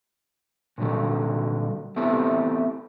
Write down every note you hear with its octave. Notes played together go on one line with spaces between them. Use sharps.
A#2 D3 F#3 G3 A4
A3 B3 C4 E4 G4 A4